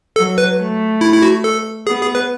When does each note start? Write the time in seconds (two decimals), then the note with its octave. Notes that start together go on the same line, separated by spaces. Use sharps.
0.16 F#3 A4
0.38 B4
0.59 A3
1.01 E4
1.13 E4
1.22 F#4
1.44 A4
1.87 B3 G#4
2.01 G#4
2.15 B4